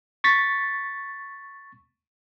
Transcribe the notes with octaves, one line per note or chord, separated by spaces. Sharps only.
C#6 A6 B6